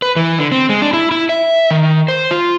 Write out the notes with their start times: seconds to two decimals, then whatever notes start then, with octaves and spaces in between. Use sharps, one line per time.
0.02 B4
0.16 E3
0.38 D3
0.52 C4
0.69 G#3
0.82 D4
0.93 E4
1.11 E4
1.29 E5
1.71 D#3
2.08 C5
2.31 F4